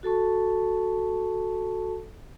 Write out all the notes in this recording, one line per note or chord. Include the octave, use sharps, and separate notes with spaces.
F#4 A4 A5 C#6